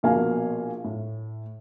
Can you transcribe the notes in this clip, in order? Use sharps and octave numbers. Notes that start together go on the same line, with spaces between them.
A#1 B2 A#3 F5 G#5
A2